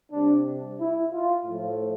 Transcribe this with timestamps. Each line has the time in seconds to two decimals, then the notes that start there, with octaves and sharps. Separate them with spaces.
0.12 C3 G3 D4
0.80 E4
1.13 F4
1.45 A2 F3 A3